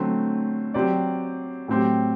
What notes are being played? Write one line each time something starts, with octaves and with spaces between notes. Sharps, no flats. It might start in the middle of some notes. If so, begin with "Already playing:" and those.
Already playing: D3 F#3 A3 C4
F#3 C4 G4 D5
A2 F#3 C4 G4